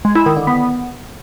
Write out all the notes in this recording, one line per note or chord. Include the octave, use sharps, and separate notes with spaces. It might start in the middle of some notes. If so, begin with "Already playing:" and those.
G#3
E4
D#3
D3
B3